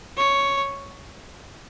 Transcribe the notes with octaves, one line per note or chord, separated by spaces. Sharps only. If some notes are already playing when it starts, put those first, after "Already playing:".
C#5